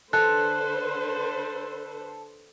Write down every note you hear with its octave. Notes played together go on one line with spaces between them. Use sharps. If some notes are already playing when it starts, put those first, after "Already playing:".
D3 A4 B4 C5 F#6